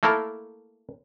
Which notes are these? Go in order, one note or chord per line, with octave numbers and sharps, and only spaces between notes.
A3 A#3 E4 A4 A#4